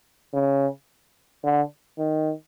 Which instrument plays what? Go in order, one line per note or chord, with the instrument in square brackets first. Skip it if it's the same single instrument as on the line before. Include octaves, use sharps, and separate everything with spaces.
[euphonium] C#3
D3
D#3